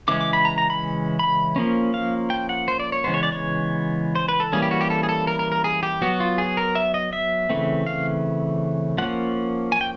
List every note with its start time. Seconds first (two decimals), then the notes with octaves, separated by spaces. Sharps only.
0.08 C#3 E3 G#3 C#4 D6
0.21 D6
0.33 B5
0.45 A#5
0.58 A#5
0.70 B5
1.19 B5
1.56 F3 A#3 C#4
1.94 F5
2.30 G5
2.49 F#5
2.68 C5
2.80 D5
2.92 C#5
3.04 C#3 E3 G#3 B3 C5
3.14 C#5
3.23 D5
3.32 C#5
4.15 C5
4.28 B4
4.40 A4
4.53 E3 G3 A#3 C#4 G#4
4.62 G4
4.71 F#4
4.81 G4
4.90 A4
5.03 G#4
5.09 A4
5.27 A#4
5.39 A#4
5.52 A#4
5.64 G#4
5.83 G4
6.02 F#3 B3 F#4
6.20 F4
6.38 G#4
6.57 A#4
6.75 E5
6.94 D#5
7.13 E5
7.50 C#3 E3 A3 C4
7.87 F5
8.98 F3 A#3 C#4 F#5
9.72 G#5
9.81 G5